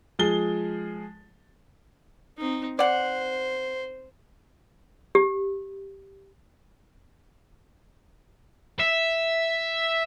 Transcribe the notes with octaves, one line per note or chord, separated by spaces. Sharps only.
F3 G#3 G#4 A6 G7
C4 D#4
C5 D5 F#5
G4
E5